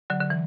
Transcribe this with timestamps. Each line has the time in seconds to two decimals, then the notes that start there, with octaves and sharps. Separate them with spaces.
0.10 D3 F#3
0.21 D3
0.30 E3